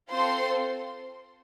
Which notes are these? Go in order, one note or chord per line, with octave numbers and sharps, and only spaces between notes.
C4 F4 A4 C5 C6